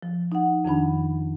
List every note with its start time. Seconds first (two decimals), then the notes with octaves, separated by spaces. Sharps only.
0.03 F3
0.32 D#4 F#5
0.65 F2 D#3 D4 B5